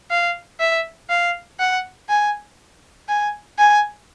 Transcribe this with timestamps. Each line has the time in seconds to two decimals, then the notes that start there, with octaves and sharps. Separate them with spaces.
0.10 F5
0.60 E5
1.09 F5
1.60 F#5
2.09 G#5
3.09 G#5
3.58 G#5